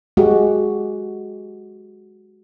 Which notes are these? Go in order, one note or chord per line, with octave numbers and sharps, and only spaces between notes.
G#3 F#4 G4